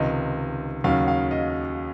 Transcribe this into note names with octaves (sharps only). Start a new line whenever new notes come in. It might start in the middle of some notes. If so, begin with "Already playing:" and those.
Already playing: C#2 C3 D#3 D#5
D#2 C#3 F#3 F5
F5
D#5